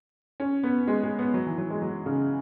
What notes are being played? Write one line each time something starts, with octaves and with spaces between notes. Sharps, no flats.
C#4
B3
G#3
G#3
B3
F#3
E3
F#3
G#3
F#3
C#3